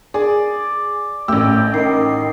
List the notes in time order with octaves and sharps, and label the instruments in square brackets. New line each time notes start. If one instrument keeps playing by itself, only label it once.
[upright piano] G#4 [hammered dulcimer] D5
[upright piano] A1 E6 [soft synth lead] A3 [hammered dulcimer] G4
[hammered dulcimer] D#3 [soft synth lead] C7